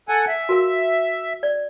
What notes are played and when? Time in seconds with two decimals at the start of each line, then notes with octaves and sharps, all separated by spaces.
0.09 A4 F#5 G#5
0.28 E5
0.49 F#4 A#4 F5
1.43 D5